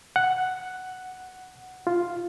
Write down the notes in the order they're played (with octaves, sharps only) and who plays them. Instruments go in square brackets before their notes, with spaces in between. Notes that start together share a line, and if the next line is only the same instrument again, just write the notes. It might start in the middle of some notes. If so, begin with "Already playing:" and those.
[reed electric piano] F#5
F4